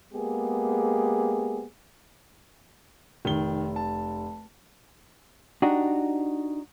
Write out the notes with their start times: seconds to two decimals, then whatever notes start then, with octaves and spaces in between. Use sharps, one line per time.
0.13 G#3 A#3 B3 G4 G#4
3.25 F1 D#3 G7
3.76 A5
5.62 D4 D#4 F#4 G4